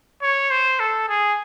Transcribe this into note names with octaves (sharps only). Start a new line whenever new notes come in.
C#5
C5
A4
G#4